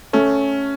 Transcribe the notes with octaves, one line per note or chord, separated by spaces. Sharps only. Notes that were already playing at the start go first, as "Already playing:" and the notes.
A3 C#4